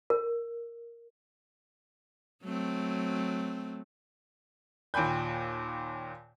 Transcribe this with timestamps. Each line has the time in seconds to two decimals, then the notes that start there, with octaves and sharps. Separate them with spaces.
0.10 A#4
2.43 F#3 A3 C4
4.94 D#2 A#2 G5 G#5 B5 G6